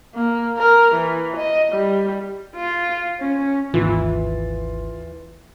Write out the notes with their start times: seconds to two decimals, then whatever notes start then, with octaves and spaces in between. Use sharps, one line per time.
0.15 A#3
0.58 A#4
0.95 E3
1.37 D#5
1.72 G3
2.56 F4
3.20 C#4
3.74 G#1 D#2 E3 F4